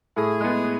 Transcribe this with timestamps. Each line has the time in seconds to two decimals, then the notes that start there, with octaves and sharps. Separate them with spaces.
0.16 A2 G#4
0.40 G#3 B3